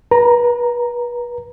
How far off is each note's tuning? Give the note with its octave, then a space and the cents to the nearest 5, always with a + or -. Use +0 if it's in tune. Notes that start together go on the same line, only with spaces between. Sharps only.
B4 -35 A#5 +0